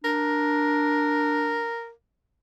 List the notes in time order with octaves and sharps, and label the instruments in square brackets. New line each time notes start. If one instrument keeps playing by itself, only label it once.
[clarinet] D4 [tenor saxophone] A#4